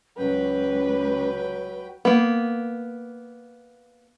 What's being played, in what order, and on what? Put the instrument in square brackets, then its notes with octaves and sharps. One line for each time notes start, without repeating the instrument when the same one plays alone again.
[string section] C#2 [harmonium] F#3 G5 [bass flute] C#4 [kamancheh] B4
[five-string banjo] A#3 B3